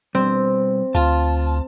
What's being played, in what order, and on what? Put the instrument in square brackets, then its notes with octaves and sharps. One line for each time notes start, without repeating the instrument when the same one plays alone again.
[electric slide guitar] B2 G3 [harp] C4
[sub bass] D2 [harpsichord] F4 [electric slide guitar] A5